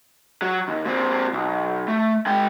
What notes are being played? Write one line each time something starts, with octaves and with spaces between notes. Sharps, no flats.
F#3
D#2
A#2 C4
B1
A3
G#3 G5